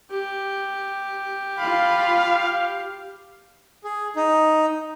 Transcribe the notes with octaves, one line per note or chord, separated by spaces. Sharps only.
G4
F4 F5 B5
G#4
D#4